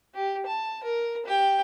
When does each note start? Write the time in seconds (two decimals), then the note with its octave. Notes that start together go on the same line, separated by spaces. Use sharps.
0.15 G4
0.46 A5
0.84 A#4
1.26 G4 G5